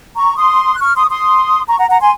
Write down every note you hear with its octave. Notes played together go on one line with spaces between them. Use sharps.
A#5 C#6
C6 D#6
F#6
C#6 F6
C6 D#6
C#6
C6 D#6
A#5 C#6
F#5 A#5
F#5 A#5
G#5 C6